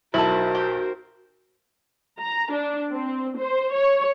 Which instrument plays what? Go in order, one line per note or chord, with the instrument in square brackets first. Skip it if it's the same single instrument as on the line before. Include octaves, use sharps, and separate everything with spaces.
[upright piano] B1 A5 [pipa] E4 [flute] F#4 [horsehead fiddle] A#4 C5
[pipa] G4
[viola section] A#5
D4
C4
C5
C#5